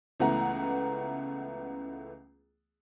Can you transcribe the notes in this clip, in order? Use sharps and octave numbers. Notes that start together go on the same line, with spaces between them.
C#2 E3 A3 B3 F#5 A#5